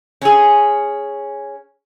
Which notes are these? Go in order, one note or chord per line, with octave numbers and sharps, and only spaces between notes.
C#4 G#4